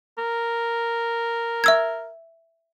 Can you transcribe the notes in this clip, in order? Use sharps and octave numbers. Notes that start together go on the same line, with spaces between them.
A#4
E5 E6 G#6